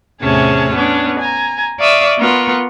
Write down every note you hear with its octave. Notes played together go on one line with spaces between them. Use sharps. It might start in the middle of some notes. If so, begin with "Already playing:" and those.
E2 A2 C3 C#4 G#4 A5
B3 C#4 D4
G#5 A#5
D5 E5 F5 C#6 D#6 E6
B3 F4 A#4 C#6